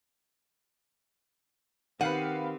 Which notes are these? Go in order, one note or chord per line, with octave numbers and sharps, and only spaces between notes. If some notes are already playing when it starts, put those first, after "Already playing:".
D#3 C4 G4 B4 F5 F#5 D#7